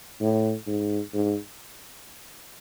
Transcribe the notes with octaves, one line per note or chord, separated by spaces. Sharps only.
A2
G#2
G#2